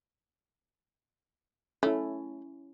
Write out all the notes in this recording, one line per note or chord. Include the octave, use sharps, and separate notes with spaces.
A3 C#4 E4